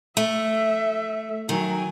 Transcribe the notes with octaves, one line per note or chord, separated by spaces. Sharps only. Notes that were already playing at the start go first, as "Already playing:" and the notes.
A3 E5
D#3 F#3 G#5